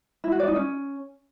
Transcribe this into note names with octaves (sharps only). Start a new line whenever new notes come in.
E4
F#4
D5
D#4
C#4